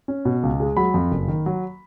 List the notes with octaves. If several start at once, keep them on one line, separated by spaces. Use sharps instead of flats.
C#4
B2
C#2
G#3
F#3 B5
F2
F#1
D#3
F#3